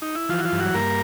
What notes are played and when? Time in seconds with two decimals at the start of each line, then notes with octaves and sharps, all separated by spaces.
0.02 D#4
0.15 E4
0.29 E3 F3 F4
0.39 F#4
0.45 F3 F4
0.52 G2
0.59 F#3 F#4
0.74 G2 A#3 A#4